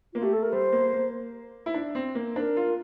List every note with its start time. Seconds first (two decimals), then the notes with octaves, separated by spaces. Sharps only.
0.13 A#3 F4
0.22 A3 G4
0.33 A4
0.42 A#4
0.52 G3 C5
0.72 A#3
0.93 A#3
1.66 E4
1.74 D4
1.95 C4
2.15 A#3
2.35 D4 A#4 C5
2.57 F4